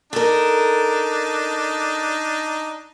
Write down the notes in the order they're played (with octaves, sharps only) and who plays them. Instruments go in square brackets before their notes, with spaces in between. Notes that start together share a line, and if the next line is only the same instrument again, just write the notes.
[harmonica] D4 D#4 [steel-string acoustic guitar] A4 A#4